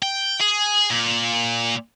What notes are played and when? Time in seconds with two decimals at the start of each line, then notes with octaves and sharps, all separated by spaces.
0.02 G5
0.40 G#4
0.90 A#2